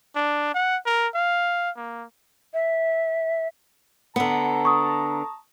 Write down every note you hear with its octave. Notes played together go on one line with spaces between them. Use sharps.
D4
F#5
A#4
F5
A#3
E5
D3 B3 A5 A#5
C#6 D#6